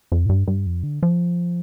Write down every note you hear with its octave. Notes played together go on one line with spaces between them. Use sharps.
F2
A2
G2
G2
F2
D3
F3